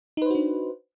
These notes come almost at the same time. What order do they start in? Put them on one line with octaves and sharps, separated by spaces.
D#4 B4 C5 F#4 D4